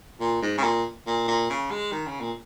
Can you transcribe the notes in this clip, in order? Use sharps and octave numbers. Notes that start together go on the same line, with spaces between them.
A#2
G#2
C#3
A#2
A#2
A#2
C#3
G#3
D#3
C#3
A#2